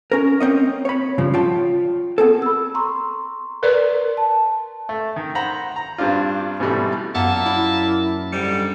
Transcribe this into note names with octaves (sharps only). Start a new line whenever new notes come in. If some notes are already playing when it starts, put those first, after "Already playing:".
C#4 A#4
A#3 C4 C#4 D#5
C#5 B5
G2 C#3 F3
F4 C#5 G5 A5
B3 C4 G#4 A4
B5 E6
A#5 C6 C#6
A#4 B4 D5
A5
A3
D#3
C5 F#5 A#5 B5
A#5
G2 G3 C4 D4 F4
G#2 B2 E3 G3 A3
F#2 A#2 A#3 B3 E5 A5
E4
G#2 D3 G3 C#7